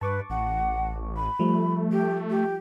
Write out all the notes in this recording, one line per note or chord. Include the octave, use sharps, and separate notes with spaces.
G2 B4 A5 C#6 D6
A1 F#5
B5
F3 G3 A3
G4
G4